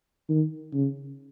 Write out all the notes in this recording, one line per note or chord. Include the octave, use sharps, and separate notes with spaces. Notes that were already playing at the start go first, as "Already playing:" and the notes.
D#3
C#3